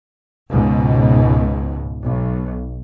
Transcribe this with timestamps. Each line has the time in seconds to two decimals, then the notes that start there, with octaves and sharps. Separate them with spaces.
0.50 C#2 G#2 B2
2.03 B1